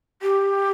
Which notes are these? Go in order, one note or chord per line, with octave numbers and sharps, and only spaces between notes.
G4